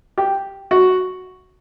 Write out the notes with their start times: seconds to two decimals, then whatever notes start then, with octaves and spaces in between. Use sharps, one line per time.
0.18 G4
0.71 F#4